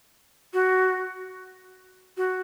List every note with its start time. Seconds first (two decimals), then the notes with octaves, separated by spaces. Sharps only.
0.54 F#4
2.17 F#4